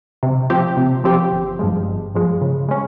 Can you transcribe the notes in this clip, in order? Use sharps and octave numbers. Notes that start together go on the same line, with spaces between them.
C3
F3 C4 G4
C3
F3 C4 G4
G1
G2 F3 G#3
G1
G2 F3 G#3
C#3
G#3 C#4